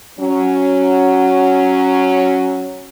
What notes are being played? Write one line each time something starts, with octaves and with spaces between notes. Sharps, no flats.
F#3 C#4